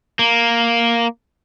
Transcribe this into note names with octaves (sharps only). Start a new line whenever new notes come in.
A#3